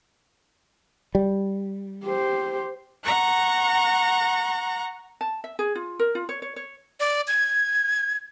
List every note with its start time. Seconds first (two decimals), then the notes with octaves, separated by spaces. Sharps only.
1.15 G3
2.05 G4 C5
3.03 F#5 A#5 C#6 F#6
5.21 A5
5.44 E5
5.59 G#4
5.75 F4
5.99 A#4
6.15 F4
6.29 C#5
6.42 C#5
6.56 C#5
7.00 D5
7.28 G#6